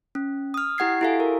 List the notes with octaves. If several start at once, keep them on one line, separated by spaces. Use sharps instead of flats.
C#4
D#6 F6
E4 G4 F#5 G#6 C7
E4 F#4 G4 A4 F5 G#5
A#4